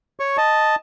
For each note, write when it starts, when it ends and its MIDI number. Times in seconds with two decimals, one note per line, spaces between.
0.20 0.37 73
0.20 0.37 85
0.37 0.76 75
0.37 0.76 81